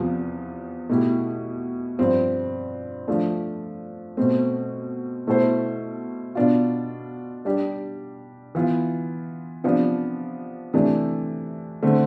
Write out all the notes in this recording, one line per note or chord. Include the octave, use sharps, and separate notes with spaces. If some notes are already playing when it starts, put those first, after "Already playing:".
Already playing: E2 C3 F3 B3
B2 A3 E4 G4
G2 F3 C4
F3 A3 D4
B2 A3 C4
B2 A3 E4 A4 C5
B2 B3 D4 F4
G3 D4 G4
E3 B3 F4
C3 F3 B3 D4
C3 E3 A3 D4
D3 A3 C4